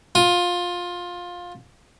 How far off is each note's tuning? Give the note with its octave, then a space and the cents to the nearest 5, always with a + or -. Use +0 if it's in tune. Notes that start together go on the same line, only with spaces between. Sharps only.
F4 +15